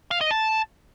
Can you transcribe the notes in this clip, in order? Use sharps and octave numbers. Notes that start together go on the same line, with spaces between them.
F5
D#5
A5